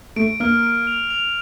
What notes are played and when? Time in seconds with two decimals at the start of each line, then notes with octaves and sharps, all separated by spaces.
0.16 A3 D7
0.40 A#3 F6
0.63 D7
0.87 F7
1.10 F7